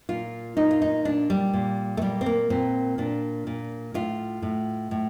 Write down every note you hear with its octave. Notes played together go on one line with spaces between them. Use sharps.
A#2 F4
A#2 D#4
F4
D#4
A#2 D4
G3
A#2
A3
A#2 G3
C4
A#3
A#2 C4
A#2 D4
A#2
A2 F4
A2
A2